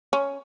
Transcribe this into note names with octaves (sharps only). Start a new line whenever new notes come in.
C#4